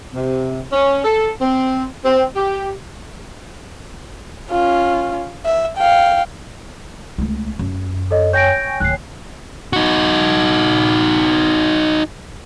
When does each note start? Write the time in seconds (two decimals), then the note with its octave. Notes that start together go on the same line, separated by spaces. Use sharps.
0.14 C3
0.73 C#4
1.05 A4
1.42 C4
2.05 C4
2.36 G4
4.51 C#4 F4
5.45 E5
5.77 F5 G5
7.18 C#2 A3
7.59 F#2
8.11 A4 C#5 D#5
8.33 C#5 G5 G#5 G6 A#6 D7
8.80 D1 D#3 F#6 C7
9.73 D#4 F#4